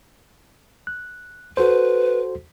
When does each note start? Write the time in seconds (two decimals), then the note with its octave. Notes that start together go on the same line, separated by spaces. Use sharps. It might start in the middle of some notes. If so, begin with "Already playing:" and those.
0.87 F#6
1.57 F#4 A4 B4 C5